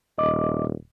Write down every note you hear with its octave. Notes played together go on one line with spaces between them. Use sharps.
D#1 D#5 D6